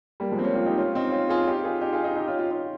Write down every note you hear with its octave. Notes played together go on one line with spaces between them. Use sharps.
G3 A#3
F3 G#3
C4
A#3 C#4
C#4 F4
D#4 G4
C#4 F4
C4 D#4
C#4 F4
F4 G#4
D#4 G4
F4 G#4
D#4 G4
F4 G#4
D#4 G4
D#4 G4
C#4 F4
C#4 F4
C#4 F4